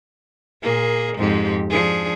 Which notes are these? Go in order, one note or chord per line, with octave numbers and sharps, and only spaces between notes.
A#2 A#3 G#4
F2 G#2 G4
F3 D4 G#4